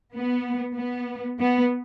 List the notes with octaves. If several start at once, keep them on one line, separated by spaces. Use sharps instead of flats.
B3
B3
B3